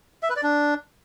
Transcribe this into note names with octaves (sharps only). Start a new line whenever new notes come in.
E5
B4
D5
D4